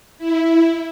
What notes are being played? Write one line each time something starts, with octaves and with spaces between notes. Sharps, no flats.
E4